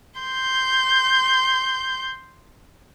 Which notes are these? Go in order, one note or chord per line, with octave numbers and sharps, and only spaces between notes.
C6 G6